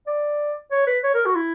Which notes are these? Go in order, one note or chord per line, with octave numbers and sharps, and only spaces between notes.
D5
C#5
B4
C#5
A#4
F#4
E4